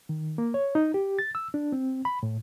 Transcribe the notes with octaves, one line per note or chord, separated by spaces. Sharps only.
D#3
A#3
C#5
D#4
G4
A6
E6
D4
C4
B5
A2